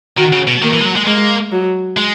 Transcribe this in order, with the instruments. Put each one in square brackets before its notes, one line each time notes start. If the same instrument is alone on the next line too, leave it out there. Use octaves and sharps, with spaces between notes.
[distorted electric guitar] D#3 [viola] F#4
[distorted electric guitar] C#3
B2
[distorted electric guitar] D#3 [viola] A#3
[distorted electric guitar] E3
G#3
F#3
G#3
[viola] G#3 [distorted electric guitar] A#3
[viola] F#3
[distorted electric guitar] G#3